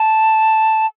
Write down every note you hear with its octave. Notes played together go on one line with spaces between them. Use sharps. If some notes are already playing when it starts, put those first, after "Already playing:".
Already playing: A5